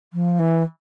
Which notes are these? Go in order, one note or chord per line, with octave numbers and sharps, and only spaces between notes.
F3
E3